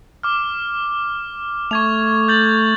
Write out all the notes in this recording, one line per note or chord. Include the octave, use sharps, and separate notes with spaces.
D6 F6
A3 C#6 G#6 F7
G6 A6 F#7